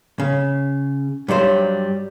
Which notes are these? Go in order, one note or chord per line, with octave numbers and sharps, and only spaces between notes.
C#3
G2 F#3 G3 C5